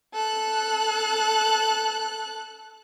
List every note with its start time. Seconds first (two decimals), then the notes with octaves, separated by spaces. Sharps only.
0.13 A4 F#6